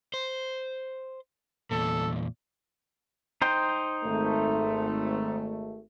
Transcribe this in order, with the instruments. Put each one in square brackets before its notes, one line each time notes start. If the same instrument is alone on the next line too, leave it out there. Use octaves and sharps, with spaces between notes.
[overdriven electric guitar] C5
[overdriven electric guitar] E2 A#2 [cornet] A4
[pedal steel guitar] D#4 C5 G5
[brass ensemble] G#1 A3